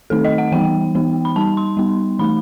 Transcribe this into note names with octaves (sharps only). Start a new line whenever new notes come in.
D#3 A3 C4 D#4 A4
D#5
F#5
E3 G3 B3 D#4 G5
E3 B3 D#4
B5
G3 D#4 A5
C6
G3 B3 D#4
E3 A3 D#4 B5